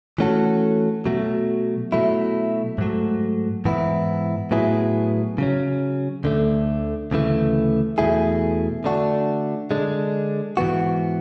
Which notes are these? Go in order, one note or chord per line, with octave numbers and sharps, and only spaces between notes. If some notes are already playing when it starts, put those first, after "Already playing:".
E3 A3 C#4 F#4 A4
B2 F#3 A3
B2 F#3 A3 E4
G#2 F#3 A3
G#2 E3 B3 E4
A2 F#3 B3 E4 G#4
C#3 F#3 C#4
D2 D3 A3
D2 C#3 E3 A3
E2 B2 A3 E4 G#4
D3 A3 D4 F#4
D3 G#3 D4
G#2 E3 B3 F#4